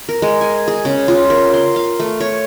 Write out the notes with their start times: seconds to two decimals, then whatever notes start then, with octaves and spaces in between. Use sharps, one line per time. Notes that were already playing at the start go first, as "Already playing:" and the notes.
0.09 A#4
0.22 G#3
0.41 G#5
0.68 G#4
0.85 C#3
1.08 F4
1.30 A#4
1.54 C6
1.76 F5
2.00 A3
2.20 C#5